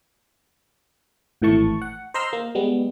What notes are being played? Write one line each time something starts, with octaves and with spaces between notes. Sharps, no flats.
G#1 A2 E3 A3 A5 C#6
F#5
C5 D#5 A#5 C6 E6 F6
A#3
G3 G#3 B3